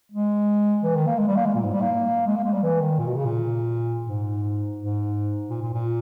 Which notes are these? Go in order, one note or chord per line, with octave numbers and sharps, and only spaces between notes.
G#3
E3
D#3
A#3
G#3
G3
A#3
G#3
A#2
G#2
G3
A#3
G#3
A#3
G#3
G3
E3
D#3
A#2
B2
C#3
A#2
G#2
G#2
A#2
A#2
A#2